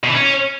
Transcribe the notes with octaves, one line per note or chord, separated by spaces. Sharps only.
B2
E3
C#4